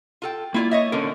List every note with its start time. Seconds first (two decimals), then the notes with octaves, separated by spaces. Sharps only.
0.22 F4 A4 G5
0.54 A#3 E4 F4 D5
0.71 C#5 D#5 E5
0.92 D3 C#4 A4 A#4